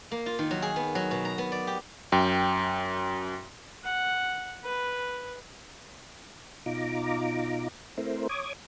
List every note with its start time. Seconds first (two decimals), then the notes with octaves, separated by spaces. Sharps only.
0.11 A#3
0.26 F4
0.39 D#3
0.51 F#3
0.62 G#4
0.76 B3
0.95 F#3
1.11 B2
1.25 A#5
1.38 B3
1.52 D5
1.67 G4
2.12 F#2 G5
3.84 F#5
4.64 B4
6.66 B2 D#4 F4 A#5 D6
7.97 A3 C4 E4 A#4 C5
8.29 C#5 D6 D#6 G#6